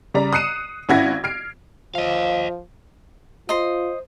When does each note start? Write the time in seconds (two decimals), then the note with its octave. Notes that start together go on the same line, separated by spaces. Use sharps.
0.14 C#3 G3 D5 A#5
0.33 D#6 F#6 C7 C#7 D#7 E7
0.89 G#1 C#4 E4 F#5 G#6 A#6
1.24 F6 C7 D7
1.95 F3 D#5 F5
3.49 F4 C5 D#5 C6